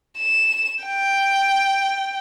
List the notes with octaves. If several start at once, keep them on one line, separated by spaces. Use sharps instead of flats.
E7
G5